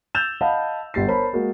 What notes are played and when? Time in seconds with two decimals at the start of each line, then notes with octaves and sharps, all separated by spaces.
0.15 E6 G6 A6 E7 F7
0.41 D#5 F5 F#5 A5 B5
0.94 G1 G3 A6 C7
1.08 A#4 C5 C#5 A5 B5
1.33 G#3 A#3 F#4